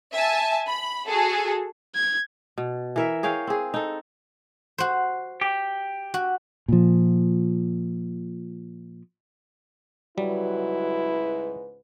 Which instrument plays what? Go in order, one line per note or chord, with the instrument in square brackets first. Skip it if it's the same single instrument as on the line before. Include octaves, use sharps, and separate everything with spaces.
[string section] E5 G#5 A5
B5
F#4 G#4 A4
[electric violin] G#6
[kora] B2
E3 A#4 E5
G#4 C#5 F5 G5
C4 G#4
D#4 A4
[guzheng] F#4 C5
[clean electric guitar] G4
[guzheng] F#4
[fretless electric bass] A#2 F3
[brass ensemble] C#2 G#2 B4 [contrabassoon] F#3 [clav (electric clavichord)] G3 [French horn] E4